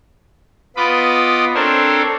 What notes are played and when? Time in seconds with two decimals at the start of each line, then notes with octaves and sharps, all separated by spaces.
0.77 B3 F4 B4 D#5 B5 D6
1.55 C4 D4 A4 A#4 C5 C#5